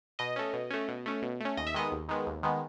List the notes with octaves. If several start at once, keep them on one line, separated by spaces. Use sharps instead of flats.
B2 D#5
A3 C#4
B2
A3 C#4
B2
A3 C#4
B2
A3 C#4
D#2 D#5
E5
D#3 G#3 B3 D#5
D#2
D#3 G#3 B3
D#2
D#3 G#3 B3